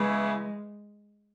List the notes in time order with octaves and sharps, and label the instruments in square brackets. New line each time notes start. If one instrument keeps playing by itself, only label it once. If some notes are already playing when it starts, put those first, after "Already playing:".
Already playing: [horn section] C#3 E3 B3 E4 [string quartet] G#3